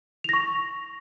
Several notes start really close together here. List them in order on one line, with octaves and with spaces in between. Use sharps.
F7 A#6 C#6